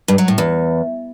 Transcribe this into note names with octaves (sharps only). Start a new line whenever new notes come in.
G2
F#3
A2
E2